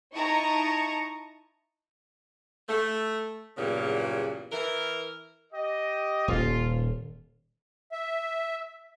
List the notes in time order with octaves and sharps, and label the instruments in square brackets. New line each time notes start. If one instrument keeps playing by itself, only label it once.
[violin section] D#4 E4 A5 A#5 C#6 D#6
[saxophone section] A3
E2 G2 A#2 C#3 F#3
E3 A#4
[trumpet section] G4 D#5
[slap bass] D#1 [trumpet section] F4
[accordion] E5